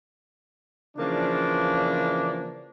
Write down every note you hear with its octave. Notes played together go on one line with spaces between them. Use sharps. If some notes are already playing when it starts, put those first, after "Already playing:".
C#3 E3 F3 A#3 D4